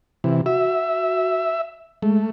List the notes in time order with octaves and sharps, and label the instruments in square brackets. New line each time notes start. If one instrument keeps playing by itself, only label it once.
[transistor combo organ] C3 E3
[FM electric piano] F#4 [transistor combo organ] E5
[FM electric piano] G#3 [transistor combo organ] A3